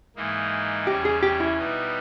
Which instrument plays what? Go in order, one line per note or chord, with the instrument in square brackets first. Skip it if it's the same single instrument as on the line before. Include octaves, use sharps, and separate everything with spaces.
[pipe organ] G#2 E3 A#3 D#4
[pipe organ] E2 C#3 G3 C#4 [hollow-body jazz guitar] G4
[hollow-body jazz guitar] G#4
G4
E4
[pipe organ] B2 G3 B3 D#4